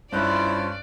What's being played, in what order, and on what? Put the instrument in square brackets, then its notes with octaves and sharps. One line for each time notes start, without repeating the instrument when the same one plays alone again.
[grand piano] G2 C#4 F#6 [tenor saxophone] E4 [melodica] F4 C5 [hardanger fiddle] D5